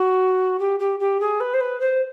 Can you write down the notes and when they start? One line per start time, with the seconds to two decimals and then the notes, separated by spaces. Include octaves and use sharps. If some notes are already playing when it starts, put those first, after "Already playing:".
Already playing: F#4
0.59 G4
0.79 G4
0.99 G4
1.20 G#4
1.40 B4
1.53 C5
1.60 B4
1.80 C5